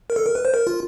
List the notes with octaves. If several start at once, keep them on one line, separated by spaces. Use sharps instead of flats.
A#4
A4
A#4
B4
C5
A#4
F4